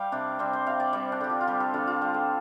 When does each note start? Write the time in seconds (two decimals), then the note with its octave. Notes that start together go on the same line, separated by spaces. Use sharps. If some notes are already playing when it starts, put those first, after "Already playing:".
Already playing: G3 C5 F5 G5
0.12 C3 D4
0.39 G3 C4
0.53 C5
0.66 C3 F5
0.80 D5
0.93 G3 C4
1.12 D4
1.21 D3 G4
1.30 F4
1.41 F4
1.47 G3 G4
1.60 A4
1.74 D3 F4
1.87 F4
2.02 G3 C5
2.14 A4